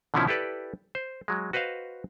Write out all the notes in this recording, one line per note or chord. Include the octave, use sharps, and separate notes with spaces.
B2 D3 D#3 F3 C#4 E4
E4 G4 A4 B4 D5
C5
F#3 G#3
F#4 B4 C5 D#5 F5